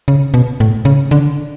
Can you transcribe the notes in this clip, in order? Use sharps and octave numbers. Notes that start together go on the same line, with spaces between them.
C#3
B2
A2
C#3
D3